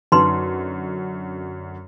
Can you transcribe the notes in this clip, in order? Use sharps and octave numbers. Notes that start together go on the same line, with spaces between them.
F#2 D3 D#4 B4 C6